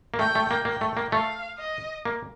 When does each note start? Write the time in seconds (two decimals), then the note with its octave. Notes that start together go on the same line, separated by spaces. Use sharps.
0.14 A#3
0.19 A3 G5
0.35 A3
0.51 A#3
0.65 A#3 G5
0.81 A3
0.97 A#3
1.12 A3 F5
1.59 D#5
2.05 A#3